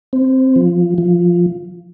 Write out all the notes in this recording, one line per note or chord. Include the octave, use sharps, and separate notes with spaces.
C4
F3
F3